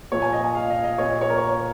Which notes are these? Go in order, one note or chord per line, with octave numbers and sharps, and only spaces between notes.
A#2 F3 C#5
G#5
D#5
G#5
F5
D#5
D#5
A#2 F3 C#5
C#5
A#4
C#5